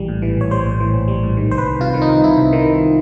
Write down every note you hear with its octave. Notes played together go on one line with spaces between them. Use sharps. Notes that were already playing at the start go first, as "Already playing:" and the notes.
Already playing: A#1 E3 G3
A2
E3
A#1 C#5
G3 C5
A2
E3
A#1
G3
A2
D#3
C2 C5
B4
C2
C3 F4
D#3
D#4
C2
C2 E4
C3
D#3
C2